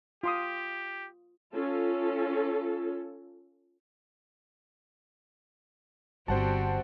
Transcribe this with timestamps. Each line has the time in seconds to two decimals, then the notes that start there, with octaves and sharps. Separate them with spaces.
0.23 F4 G4 C6 D#6
1.54 C#4 F4 A4
6.28 G1 G3 C4 F#4 C5 F#5 A5